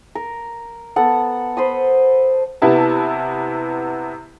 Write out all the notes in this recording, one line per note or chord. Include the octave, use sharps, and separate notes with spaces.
A#4
B3 A4 F#5
C5 B5 D#6
C3 B3 E4 A5